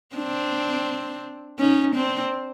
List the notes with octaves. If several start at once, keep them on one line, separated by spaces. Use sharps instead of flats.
C4 D4
C#4 D#4
C4 D4